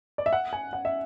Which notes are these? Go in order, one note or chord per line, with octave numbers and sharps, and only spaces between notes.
D5
E5
F#5
G#5
F#5
E5